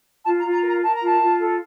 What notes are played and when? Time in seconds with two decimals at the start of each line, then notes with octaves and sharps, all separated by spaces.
0.25 F4 A5
0.38 A#5
0.44 F4
0.53 A#5
0.63 A#4 A#5
0.82 A#4 A5
0.94 A#5
1.02 F4 A5
1.20 F4
1.39 A4